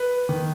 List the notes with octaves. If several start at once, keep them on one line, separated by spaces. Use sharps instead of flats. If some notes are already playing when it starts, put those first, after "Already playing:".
Already playing: B4
D#3